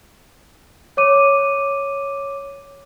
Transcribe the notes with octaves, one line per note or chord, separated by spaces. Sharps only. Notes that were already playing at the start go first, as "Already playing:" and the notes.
C#5 D6 D#7